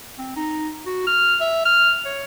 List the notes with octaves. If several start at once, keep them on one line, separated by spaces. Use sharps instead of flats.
C4
D#4
F#4
F6
E5
F6
C#5